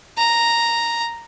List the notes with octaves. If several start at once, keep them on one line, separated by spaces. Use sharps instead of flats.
A#5